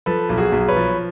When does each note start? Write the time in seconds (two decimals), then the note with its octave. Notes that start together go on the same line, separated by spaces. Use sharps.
0.06 F3 A4 B4
0.29 B1
0.37 F#4 G#4
0.52 B1
0.68 B4 C#5
0.76 F3